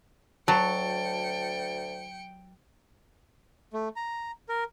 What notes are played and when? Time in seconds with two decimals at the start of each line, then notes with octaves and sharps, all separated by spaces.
0.48 D2 F#3 G5 A5 C#7
3.73 A3
3.96 A#5
4.49 A#4